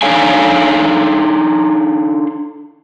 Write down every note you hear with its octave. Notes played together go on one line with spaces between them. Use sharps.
D4 D#4 A4 C#5 F5 G#5